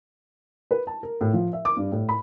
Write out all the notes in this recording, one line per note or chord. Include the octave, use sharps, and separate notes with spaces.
B4
A5
A#4
A2
F3
E5
D6
G2
A2
B5